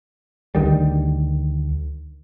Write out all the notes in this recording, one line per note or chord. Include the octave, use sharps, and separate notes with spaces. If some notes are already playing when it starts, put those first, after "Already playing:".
D2 D#3 G3